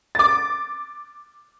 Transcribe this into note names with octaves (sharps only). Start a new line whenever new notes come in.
D6 A6